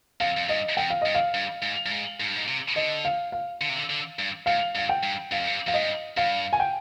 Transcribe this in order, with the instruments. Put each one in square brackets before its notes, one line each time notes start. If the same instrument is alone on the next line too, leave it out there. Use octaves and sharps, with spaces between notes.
[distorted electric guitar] F2 [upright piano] F5
[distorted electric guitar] F2
[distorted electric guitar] G2 [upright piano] D#5
[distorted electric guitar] F2 [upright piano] G5
[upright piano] F5
[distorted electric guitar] G2 [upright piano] D#5
[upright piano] F5
[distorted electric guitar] G2
G#2
G2
G#2
G#2
G2
G#2
C3
[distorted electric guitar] D3 [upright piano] D#5
[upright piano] F5
F5
[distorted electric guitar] D3
C3
D3
D3
G2
[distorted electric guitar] G#2 [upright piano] F5
[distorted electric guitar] G2 [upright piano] F5
[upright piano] G5
[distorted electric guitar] G2
[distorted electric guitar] G2 [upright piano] F5
[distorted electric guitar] F2
G2
[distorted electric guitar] F2 [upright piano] F5
[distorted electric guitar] G2 [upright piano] D#5
[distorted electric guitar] G2 [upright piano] F5
[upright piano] G#5
G5